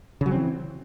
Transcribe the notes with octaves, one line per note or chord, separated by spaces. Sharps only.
C#3 E3 F#3 C4